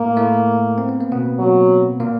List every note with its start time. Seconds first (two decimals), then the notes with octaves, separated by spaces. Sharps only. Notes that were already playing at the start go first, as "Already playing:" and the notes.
Already playing: A2 A3 A#3
0.17 A2 A3
0.78 C4
0.89 B3
1.01 A#3
1.12 B2 B3
1.39 F#3
2.00 A#2 A#3